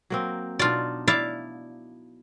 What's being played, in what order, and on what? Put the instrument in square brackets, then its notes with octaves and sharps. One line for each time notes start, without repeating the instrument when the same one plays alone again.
[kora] F#3 A#3 C4
[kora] B2 D4 D#4 [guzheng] F4 D5
[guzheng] E4 D5 F5